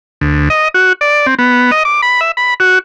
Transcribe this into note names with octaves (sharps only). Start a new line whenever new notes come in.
D2
D#5
F#4
D5
C4
B3
D#5
D6
B5
E5
B5
F#4